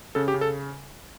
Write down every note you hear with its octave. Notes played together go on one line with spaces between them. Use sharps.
C#3 A4
G4
C#3
A4